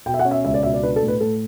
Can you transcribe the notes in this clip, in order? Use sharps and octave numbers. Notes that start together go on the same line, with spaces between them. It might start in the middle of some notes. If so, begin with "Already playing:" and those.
B2 G5
E5
F#5
C#4
E5
C#2 E5
D5
B2 E5
D5
D4 B4
A4
A2
B4
A2 A4